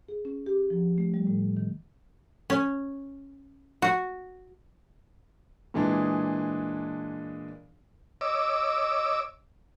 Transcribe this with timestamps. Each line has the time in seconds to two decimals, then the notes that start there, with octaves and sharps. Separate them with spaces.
0.09 G#4
0.25 C#4
0.46 G4
0.70 F3
0.98 A3
1.14 G3
1.27 A2
1.57 D#3
2.50 C#4
3.82 F#4
5.74 A#2 E3 G#3 D4 G#4
8.21 C#5 D#5 D6 E6